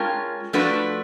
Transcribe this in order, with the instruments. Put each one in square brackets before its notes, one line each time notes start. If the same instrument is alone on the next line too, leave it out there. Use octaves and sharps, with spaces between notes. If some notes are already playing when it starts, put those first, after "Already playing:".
Already playing: [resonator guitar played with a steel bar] G#3 C#4 F4 A#4 [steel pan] G5 A5
[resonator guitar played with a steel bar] F3 A3 D4 F#4 B4